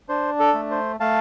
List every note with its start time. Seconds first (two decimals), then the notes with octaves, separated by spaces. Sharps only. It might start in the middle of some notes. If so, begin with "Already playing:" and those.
0.09 D4 C5
0.40 A4
0.54 A3
0.71 C5
1.00 A3 F5 A5